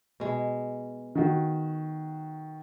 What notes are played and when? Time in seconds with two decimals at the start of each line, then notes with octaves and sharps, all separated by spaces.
0.20 B2 G#3
1.15 D#3 F#4